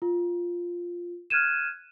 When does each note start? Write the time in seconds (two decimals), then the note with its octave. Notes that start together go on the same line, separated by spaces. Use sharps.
0.02 F4
1.30 F6 F#6 G#6 D#7 E7